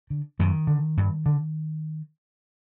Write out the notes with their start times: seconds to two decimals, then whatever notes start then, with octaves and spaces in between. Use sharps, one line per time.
0.10 D3
0.39 F#2 D#3
0.67 D3
0.97 G2
1.26 D3